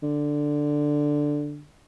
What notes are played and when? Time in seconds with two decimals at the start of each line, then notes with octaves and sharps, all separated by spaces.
0.03 D3